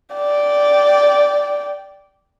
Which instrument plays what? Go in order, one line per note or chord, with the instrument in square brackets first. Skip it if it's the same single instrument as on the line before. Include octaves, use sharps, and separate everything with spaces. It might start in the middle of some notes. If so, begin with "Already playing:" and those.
[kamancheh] D5 G5